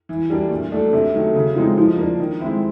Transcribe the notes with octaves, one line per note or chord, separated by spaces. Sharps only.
E3
G3 A#3 D4
A#2
F#3 A3 D4
C3
D#3 F#3 A3
C#3
F3 G#3 C4 D#4
F3
A#3 D4
D#3
G#3 C4 E4